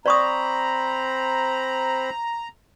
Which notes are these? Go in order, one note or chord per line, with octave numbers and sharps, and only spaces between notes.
C4 C5 D5 A#5 B5 C#6 D#6